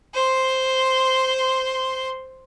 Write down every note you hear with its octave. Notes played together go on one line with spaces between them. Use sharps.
C5 C6